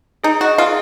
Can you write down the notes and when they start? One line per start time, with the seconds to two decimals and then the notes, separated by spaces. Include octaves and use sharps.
0.24 D#4 G#4
0.41 F#4 D#5
0.58 F4 G#4